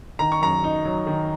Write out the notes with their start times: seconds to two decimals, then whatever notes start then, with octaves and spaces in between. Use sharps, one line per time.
0.19 D#3 A#5
0.32 C#6
0.41 F#2 A#5
0.64 D#4
0.85 F#3
1.07 D#3